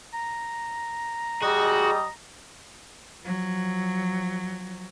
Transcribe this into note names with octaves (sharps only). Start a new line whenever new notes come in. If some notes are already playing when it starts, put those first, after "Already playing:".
A#5
G3 F#4 G#4 D#5
F3 F#3